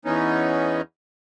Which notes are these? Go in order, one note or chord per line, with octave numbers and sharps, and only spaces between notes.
E2 B3 C#4 D#4